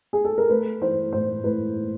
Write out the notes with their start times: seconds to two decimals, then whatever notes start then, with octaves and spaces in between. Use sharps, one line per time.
0.13 G#4
0.25 A4
0.38 A#4
0.50 A3 B4
0.81 E3 C5
1.12 A2 C5
1.44 A2 B4